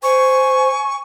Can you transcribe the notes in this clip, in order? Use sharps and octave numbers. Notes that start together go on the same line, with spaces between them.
C5 G#5 C#6